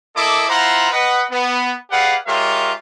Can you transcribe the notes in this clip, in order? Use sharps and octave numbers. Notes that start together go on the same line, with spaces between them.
A#3 E4 A4 D#5 D6
E4 F4 C5 F#5 A#5
B4 D#5 F#5
B3
G4 G#4 B4 D5 F5 F#5
G#3 F4 G4 A#4 C#5 E5